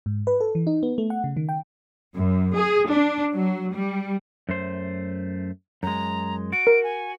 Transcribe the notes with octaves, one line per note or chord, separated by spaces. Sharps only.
G#2
B4
A4
E3
D#4
B3
A3
F#5
C#3
D#3
G5
F#2
G#4
D4
F#3
G3
F#2 A3 C5
F#2 G#3 A#5
F#4 D7
A#4
G#5